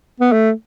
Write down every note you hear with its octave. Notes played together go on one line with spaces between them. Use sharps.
B3
A3